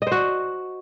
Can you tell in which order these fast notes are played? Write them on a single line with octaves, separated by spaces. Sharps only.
D#5 C5 F#4